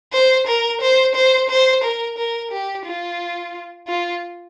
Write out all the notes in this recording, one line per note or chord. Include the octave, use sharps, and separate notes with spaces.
C5
A#4
C5
C5
C5
A#4
A#4
G4
F4
F4